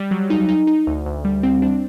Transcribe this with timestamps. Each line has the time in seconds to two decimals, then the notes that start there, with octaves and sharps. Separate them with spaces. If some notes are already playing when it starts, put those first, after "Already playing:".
Already playing: G3
0.11 F#3
0.30 D#4
0.49 D#4
0.67 D#4
0.87 D2
1.06 D2
1.25 G3
1.43 C4
1.62 D4